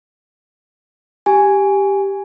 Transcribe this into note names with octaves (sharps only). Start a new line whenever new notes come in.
G4 G#5